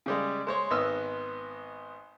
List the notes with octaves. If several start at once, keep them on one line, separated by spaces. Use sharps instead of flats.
C#3 G3 G#3
G#3 C5 C#5
G#1 B3 D#5 E6 F6